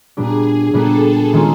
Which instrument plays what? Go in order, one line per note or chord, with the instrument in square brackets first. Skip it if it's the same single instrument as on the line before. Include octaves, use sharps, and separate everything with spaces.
[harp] A#2 G3 B3 D4 G4 [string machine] G#4
[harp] A#2 G3 B3 D4 G4 [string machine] A4
[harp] D#3 G#3 C#4 F4